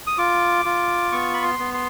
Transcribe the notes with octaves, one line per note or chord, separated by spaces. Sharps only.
D#6
F4 D6
F4
B3 C#6
B5
C6
B3
C6